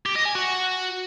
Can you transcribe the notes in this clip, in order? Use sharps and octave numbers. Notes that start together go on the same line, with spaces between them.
G4
D#5
G#5
F#4